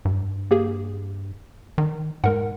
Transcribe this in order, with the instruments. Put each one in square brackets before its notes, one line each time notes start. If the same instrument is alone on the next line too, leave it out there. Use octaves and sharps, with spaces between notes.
[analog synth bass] G2
[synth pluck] A#3 G4 G#4
[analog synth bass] D#3
[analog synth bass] G#2 [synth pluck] G#3 A#4 F#5